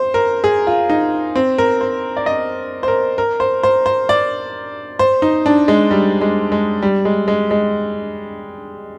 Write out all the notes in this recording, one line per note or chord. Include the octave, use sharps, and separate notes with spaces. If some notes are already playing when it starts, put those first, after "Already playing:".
Already playing: C5
A#4
G#4
F4
D#4
C4
A#4
C5
D5
D#5
C5
A#4
A#4
C5
C5
C5
D5
C5
D#4
D4
G#3
G3
G#3
G#3
G3
G#3
G#3
G#3